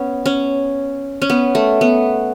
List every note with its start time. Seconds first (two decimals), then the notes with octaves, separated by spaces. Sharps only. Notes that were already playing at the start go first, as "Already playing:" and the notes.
Already playing: B3 C#4
0.26 C#4
1.22 C#4
1.30 B3
1.55 A3
1.81 B3